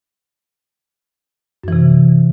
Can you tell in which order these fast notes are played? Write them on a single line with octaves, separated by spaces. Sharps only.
F#2 E3 C3